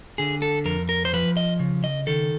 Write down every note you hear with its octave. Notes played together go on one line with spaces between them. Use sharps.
D3 G#4
A4
F2 A#4
A#4
C5
F3 B4
D#5
C#3
D#5
D#3 A4